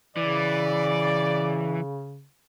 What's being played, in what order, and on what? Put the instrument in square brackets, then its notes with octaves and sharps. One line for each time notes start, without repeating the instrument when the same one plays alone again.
[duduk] C#3 [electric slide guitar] E3 [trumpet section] D5